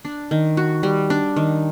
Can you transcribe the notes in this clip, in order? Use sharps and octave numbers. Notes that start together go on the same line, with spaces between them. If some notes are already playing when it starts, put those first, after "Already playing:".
D4
D#3
F#4
G3
D4
D#3